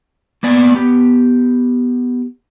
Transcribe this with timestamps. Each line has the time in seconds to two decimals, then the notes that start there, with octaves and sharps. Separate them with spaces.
0.43 A#3 B3 D5 G#5
0.75 B3 G4